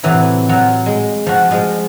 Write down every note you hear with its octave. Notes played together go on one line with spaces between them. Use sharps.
A2 C3 E3 F#3
F#3 F4
G#3
F3 F#4
F3 G#3